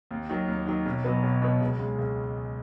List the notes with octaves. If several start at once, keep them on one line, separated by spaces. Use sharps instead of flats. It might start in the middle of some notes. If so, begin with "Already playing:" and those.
D#2
D#3 F#3
D#2
D#3 F#3
B1
B2 F#3 B3
B1
B2 F#3 B3
C#2
C#3 G#3
C#2